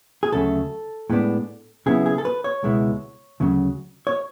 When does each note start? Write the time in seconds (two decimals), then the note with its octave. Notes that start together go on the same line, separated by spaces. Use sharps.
0.23 G#4
0.32 D2 C#3 F#3 A3 A4
1.10 A2 G#3 B3 D4
1.86 C#3 F#3 B3 E4 G#4
2.06 G#4
2.18 A4
2.25 B4
2.44 C#5
2.63 C#2 B2 G#3 B3 E4
3.40 D2 C#3 F#3
4.07 C#5